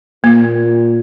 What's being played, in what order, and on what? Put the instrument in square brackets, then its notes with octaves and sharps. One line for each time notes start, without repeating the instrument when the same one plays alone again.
[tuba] A#2 [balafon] A#3